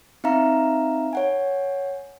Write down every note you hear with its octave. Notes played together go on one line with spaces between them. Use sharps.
C4 D#4 E5 F5 A#5
C#5 F#5 G#5